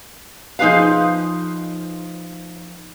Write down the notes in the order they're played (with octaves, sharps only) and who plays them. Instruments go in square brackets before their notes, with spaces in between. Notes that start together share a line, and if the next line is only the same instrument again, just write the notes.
[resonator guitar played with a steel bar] F3 D#4 G#4 B4 F5